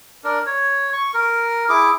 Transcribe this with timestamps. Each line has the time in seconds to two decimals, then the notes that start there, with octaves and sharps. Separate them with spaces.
0.24 D4 A#4
0.46 C#5
0.93 C#6
1.14 A#4
1.69 E4 G#4 D6